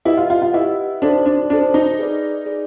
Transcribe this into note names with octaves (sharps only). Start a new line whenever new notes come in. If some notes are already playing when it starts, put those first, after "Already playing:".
E4 G4 B4 D#5 F#5
F4
F4
F4
E4 G4 B4 D#5 F#5
D4 D#4 F#4 A4 C5
D4
D4 D#4 F#4 A4 C5
D#4
G#4 B4 D5
G#4 B4 D5